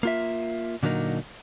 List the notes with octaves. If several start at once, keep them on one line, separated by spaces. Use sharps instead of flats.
A#3 F4 E5
A#2 D3 F#3 A#3 D#4